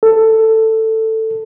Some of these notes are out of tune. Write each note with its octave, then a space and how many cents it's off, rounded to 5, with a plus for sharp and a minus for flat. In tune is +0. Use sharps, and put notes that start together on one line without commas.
A4 +10